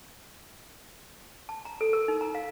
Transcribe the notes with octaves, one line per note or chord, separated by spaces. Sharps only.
A5
A#5
A4
A#4
D#4
A#5
F5